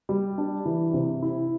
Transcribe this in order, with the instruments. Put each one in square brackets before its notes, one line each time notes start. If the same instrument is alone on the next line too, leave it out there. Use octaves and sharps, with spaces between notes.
[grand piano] G3
D4
E3
C3
E4